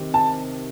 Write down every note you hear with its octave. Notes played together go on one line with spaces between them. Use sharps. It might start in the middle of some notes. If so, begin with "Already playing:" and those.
Already playing: C3 D#3
A5